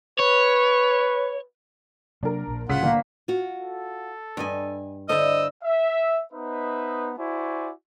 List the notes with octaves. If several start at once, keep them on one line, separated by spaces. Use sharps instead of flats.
B4 C#5
C3 F#3 A#3 D4 A#4
A#1 A#2
C2 A2 C#3 F4 F#5 B6
G1 A#3
F4 F#4
A4
G2 D#5 G5 G#5 B5
D3 E4 A4 C5 D#5 E6
E5
B3 D#4 B4 C5 D#5 E5
E4 F#4 C5 D5 G#5 C#6